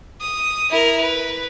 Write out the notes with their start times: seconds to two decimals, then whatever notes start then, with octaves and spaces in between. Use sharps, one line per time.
0.20 D#6
0.70 E4 A#4
1.00 B4